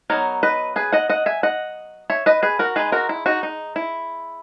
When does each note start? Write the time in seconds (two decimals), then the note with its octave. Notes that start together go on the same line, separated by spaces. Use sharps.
0.10 F#3 B3 D#4 A#4 C#5
0.43 B4 D#5
0.76 G#4 B4
0.92 D#5 F#5
1.09 D#5 F#5
1.26 E5 G#5
1.43 D#5 F#5
2.10 C#5 E5
2.26 B4 D#5
2.43 G#4 B4
2.59 F#4 A#4
2.76 G#3 D#4 G#4 B4
2.92 F#4 A#4
3.09 E4
3.26 D#4 F#4
3.43 D#4
3.76 E4